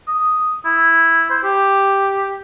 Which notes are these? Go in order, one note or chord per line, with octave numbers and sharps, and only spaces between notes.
D#6
E4
C5
G4